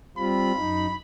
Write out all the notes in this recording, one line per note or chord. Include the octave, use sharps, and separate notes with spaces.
G3 C4 F4 B5
F#2 D#4